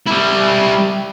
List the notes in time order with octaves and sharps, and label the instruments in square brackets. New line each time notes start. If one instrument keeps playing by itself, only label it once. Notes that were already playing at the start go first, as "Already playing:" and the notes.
[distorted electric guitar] G3 E4